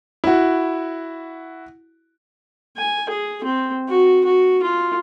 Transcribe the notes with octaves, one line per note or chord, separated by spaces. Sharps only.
E4 F#4
G#5
G#4
C4
F#4
F#4
F4